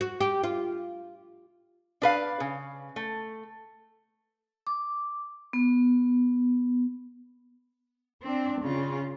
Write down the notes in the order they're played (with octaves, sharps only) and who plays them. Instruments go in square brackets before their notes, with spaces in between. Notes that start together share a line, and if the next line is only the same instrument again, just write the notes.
[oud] F#4
G4
F4
[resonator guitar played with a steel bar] D4 B4 F5
C#3
A3
[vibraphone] D6
B3
[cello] C4 D4
C#3 F4